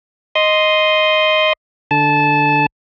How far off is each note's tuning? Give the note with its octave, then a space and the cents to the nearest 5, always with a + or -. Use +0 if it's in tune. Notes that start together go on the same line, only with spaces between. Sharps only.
D#5 +0 C6 +0 D#6 +0
D3 +5 A5 -15